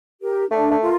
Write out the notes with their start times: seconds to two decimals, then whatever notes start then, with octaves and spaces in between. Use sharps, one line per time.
0.21 G4 A#4
0.51 A3 D4
0.71 A3
0.81 F4 A#4